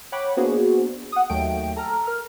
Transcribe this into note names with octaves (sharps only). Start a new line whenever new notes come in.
C#5 F#5 G5 B5 D6
A#3 B3 D4 F#4 G#4 C5
F#5 D#6
D#2 F#3 A3 G5 D7
A4 A#5 F6
A#4 F6